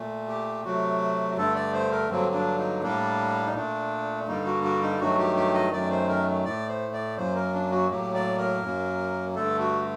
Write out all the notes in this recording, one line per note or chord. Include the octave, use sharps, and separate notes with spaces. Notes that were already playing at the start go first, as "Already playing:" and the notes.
Already playing: A#2 A3
G4
C3 F#3 A3 F#4
G2 D3 A3 A4
D5
C5
A#4
G2 D3 F#3 A#3 C4
D4
D#4
A2 G3 A#3 D4
D#4
A#2 A3 D4
G2 D3 G3 A#3 D#4
F#4
F#4
D#4
G2 D#3 F#3 A3 F#4
G4
G4
D#5
F#2 D#3 F#3 A3 D5
C5
A#4
A2 A3 D5
C5
D5
F#2 F#3 A#3 C5
A#4
D4
F#4
A2 F#3 A#3 G4
D5
A#4
F#2 F#3 A#3
G2 D3 A3 A4
F#4